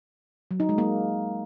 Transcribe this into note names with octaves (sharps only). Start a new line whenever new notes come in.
F#3
D#4
G#3
A#3